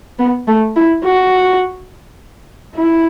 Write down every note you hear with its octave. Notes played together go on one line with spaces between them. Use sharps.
B3
A3
E4
F#4
E4